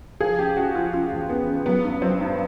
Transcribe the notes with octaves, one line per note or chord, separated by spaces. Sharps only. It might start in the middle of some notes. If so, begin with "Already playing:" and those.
F3 G#4
C#3 G4
C#3 F#4
F3 F4
C#3 F4
E2
C#3 B3
C#3
F#3 B3
G2
F#3 C4
G2